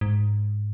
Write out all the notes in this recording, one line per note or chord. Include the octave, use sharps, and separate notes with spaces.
G#2